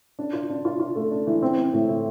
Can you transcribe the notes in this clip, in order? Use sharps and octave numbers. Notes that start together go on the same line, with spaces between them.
D4
F4
D4
F4
F4
A3
D4
E3
C4
C4
A2
A2